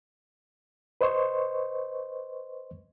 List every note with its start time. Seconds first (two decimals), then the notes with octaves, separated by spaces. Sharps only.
1.01 B4 C5 D#5 C6 C#6